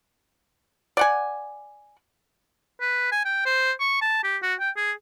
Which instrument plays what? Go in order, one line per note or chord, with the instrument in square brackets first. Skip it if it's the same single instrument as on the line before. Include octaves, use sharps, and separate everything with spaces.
[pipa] D5 F#5 G#5
[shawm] B4
G#5
G5
C5
C#6
A5
G4
F#4
G5
G#4